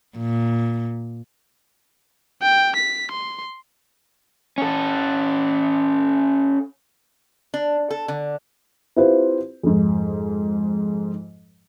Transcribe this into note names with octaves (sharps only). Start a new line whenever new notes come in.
A#2
G5
B6
C6
C#4 A4
D4
A4
D3
C4 E4 F4 G4 B4 C5
F2 G#2